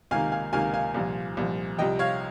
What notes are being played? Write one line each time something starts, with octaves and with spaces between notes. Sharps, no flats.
C#2 C3 D#3 A#3 F5 G#5
F5 G#5
C#2 C3 D#3 A#3 F5 G#5
F5 G#5
C2 A#2 F3
C2 A#2 F3
C2 C3 F3 D#5 G5
C#5 F5